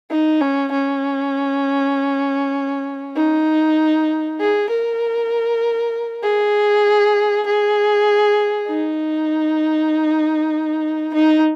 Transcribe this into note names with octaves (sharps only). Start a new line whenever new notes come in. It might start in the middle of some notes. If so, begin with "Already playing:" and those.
D#4
C#4
C#4
D#4
G#4
A#4
G#4
G#4
D#4
D#4